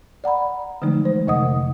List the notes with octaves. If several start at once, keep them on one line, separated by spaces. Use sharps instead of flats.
D5 F#5 A#5 B5
D3 E3 F3 G#3 A3 D#4
C5
F2 C3 D#5 F#5 D#6